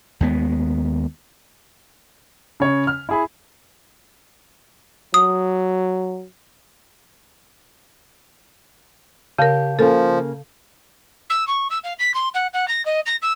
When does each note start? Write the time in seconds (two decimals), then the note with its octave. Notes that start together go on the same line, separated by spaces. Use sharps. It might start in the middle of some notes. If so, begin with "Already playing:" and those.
0.21 D#2 G#3 B3
2.60 C#3 C#5
2.87 F6
3.09 E4 G#4 B5
5.14 F#3 D#6
9.39 C#3 G4 A#4 F5 A5 G6
9.79 C#3 F3 A#3 A4
11.30 E6
11.47 C#6
11.70 E6
11.84 F5
11.99 B6
12.14 C6
12.34 F#5
12.53 F#5
12.68 A#6
12.85 D#5
13.06 A#6
13.22 E6